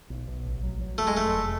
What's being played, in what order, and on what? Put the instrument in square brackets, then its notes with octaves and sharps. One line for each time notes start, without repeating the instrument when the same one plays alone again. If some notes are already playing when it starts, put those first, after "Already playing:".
[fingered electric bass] B1
B1
A1
F#3
F#3
[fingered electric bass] F1 [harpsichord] A3
[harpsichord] G#3
[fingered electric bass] F1 [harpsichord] A3
[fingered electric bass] F1